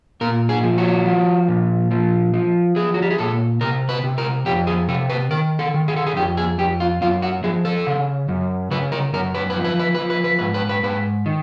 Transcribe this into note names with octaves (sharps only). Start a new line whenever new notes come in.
A#2 A#4
G#4
F3
F#4
F3
A#2
F3
F3
F3 G#4
F#4
G4
G#4
A#2 A4
C3 A#4
B4
C3
A#4
F2 G4
G#4
C3 A4
B4
D#3 A#4
A4
D#3
G#4
A4
G#4
F2 G4
G#4
F2 G4
F4
F#2 F4
F#4
F3 G#4
A4
C#3
F#2
C#3 B4
A#4
F#2 A#4
B4
B4
F3
B4
B4
B4
F3
B4
B4
G#2 B4
B4
B4
G#2 B4
D#3